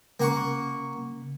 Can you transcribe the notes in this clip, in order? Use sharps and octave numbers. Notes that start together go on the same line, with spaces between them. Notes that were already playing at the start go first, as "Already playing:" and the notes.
C#3 A#3 F#5 C#6